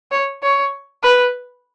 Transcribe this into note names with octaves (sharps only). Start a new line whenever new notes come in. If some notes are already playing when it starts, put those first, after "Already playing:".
C#5
C#5
B4